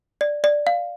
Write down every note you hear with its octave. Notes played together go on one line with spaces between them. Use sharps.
D5
D5
F5